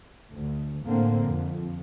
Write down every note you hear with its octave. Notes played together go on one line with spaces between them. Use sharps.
D2
A2 D3 A#3 C4
F2